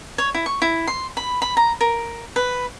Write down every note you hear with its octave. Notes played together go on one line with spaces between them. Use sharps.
C#5
E4
C#6
E4
C6
B5
B5
A#5
A#4
B4